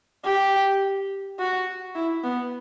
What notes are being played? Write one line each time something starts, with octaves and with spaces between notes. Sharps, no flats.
G4
F#4
E4
B3